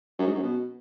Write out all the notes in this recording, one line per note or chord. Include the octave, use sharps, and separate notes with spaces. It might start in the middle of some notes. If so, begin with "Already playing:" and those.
F#2
G#2
F#2
B2